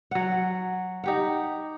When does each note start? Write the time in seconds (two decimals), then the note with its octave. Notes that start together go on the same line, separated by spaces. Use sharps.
0.11 F#3 F#5
1.04 D#4 G4 F#5